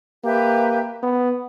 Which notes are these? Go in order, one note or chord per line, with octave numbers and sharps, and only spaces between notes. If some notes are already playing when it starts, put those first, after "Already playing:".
A#3 G4 B4 E5
B3